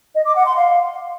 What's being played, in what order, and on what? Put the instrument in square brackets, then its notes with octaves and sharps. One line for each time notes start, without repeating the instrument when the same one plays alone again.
[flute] D#5
D6
F#5
C6
F5